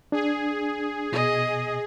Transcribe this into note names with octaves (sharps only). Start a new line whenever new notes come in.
D4 G#4
B2 D#5